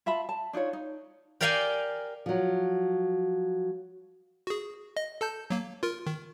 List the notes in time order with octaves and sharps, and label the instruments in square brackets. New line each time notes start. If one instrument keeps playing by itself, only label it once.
[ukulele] F4 E5 A5 B5
A5
D4 D#4 F4 C#5
D#4
[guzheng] G4 A#4 D5 F5 G5 G#5
[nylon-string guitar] F3 F#3
[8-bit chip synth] F#4 G#4
D#5
A4 A5 G6
F#3 A#3
F4 A#4
D#3